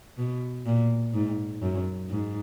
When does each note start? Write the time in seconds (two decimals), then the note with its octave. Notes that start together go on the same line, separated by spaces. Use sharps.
0.18 B2
0.66 A#2
1.14 G#2
1.62 F#2
2.10 G#2